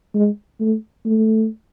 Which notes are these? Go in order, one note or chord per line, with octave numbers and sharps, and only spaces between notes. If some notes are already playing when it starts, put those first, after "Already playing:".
G#3
A3
A3